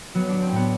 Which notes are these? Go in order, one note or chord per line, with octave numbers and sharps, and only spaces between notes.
F#3 B3
F#3 D4
C4
A2 B3